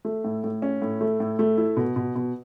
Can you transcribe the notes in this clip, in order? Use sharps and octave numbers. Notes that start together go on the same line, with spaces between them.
A3
A2
A2
C#4
A2
A3
A2
A3
E4
B2
B2
B2